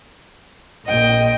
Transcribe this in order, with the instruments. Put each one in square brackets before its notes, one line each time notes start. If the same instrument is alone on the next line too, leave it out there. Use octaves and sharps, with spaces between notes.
[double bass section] A#1 A#2 [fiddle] D#5 G5